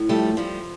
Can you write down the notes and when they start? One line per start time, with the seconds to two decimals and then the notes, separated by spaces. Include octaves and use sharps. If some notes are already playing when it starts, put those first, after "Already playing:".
Already playing: A2
0.09 F3 G3 A3
0.37 F3 G3